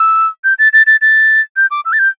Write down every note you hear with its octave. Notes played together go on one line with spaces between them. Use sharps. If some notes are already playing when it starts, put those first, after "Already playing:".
Already playing: E6
G6
A6
A6
A6
A6
G6
D6
E6
A6
G6